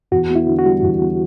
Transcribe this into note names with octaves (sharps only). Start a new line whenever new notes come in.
E2 F#4
B3
E4
D3
F#4
G3
E2
B3